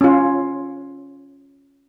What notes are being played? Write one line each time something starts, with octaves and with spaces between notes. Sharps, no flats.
C#4 F4